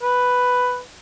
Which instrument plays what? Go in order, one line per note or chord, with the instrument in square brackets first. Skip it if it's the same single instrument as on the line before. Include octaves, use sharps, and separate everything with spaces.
[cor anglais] B4